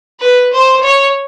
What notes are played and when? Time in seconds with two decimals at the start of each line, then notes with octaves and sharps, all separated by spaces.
0.20 B4
0.53 C5
0.83 C#5